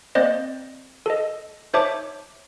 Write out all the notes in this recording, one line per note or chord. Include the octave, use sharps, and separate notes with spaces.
A#3 C4 C5 D5 D#5
A4 D#5
D#4 C5 C#5 E5 A5 D6